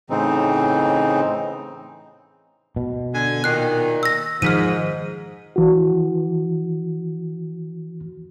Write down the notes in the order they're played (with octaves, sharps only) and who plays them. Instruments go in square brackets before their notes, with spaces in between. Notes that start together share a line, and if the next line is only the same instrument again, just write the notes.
[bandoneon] A2 C#3 E3 C4 D#4
[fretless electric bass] B2
[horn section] D3 G#5
[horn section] A#2 D#3 [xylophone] F#6 C7
[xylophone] E6 A#6
[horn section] G#2 [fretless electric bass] D#3 F3 [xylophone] F6 B6 D#7
[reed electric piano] E3 F#4